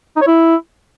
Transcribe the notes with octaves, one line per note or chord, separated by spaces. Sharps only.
D#4
C#5
E4